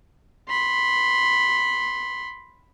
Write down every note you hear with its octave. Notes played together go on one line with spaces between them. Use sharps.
B5 C6